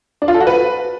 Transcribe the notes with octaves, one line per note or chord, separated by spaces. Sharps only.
D4
F4
A4
F#4
B4